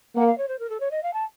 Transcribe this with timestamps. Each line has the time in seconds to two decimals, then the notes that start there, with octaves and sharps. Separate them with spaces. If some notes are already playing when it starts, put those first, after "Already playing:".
0.16 A#3 F#5
0.26 F5
0.38 C#5
0.48 C5
0.59 A#4
0.70 A4
0.80 C#5
0.91 D#5
1.03 F5
1.13 A5